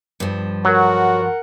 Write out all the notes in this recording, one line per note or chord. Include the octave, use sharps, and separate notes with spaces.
G2 F3
F#3 F#4 A#4 F#5